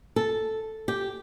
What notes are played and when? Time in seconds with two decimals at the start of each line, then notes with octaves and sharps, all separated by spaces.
0.16 A4
0.88 G4